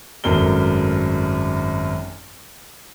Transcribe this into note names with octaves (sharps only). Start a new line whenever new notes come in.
G#1 F#2 A3 A#4 G7